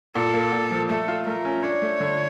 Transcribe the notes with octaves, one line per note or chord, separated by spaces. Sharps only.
A#2 A4
A#3
A#2
F3
A3 A4
F4
A3 A#4
C#4
D4 C#5
A3
D3